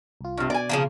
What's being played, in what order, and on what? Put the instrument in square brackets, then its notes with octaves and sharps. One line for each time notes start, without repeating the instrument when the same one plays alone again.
[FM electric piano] C2 F4
[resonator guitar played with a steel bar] G2 C3
[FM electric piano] B2 [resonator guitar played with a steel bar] D5 G#5
[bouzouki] C#3 F3 A#3